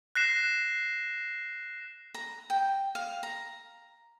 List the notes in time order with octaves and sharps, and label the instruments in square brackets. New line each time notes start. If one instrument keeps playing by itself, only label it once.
[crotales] F#6 A#6 C7 E7
[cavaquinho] A#5
G5
F5
A#5